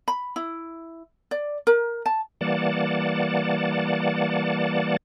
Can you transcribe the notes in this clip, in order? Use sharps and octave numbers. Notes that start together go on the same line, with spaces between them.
B5
E4
D5
A#4
A5
E3 G3 A#3 D5 F#5 A5